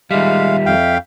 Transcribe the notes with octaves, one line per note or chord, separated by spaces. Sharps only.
D#3 G3 G#3 E5 F5
F2 F5 G5